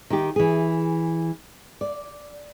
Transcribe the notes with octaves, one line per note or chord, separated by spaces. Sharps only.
D#3 G4
E3 G#4
D5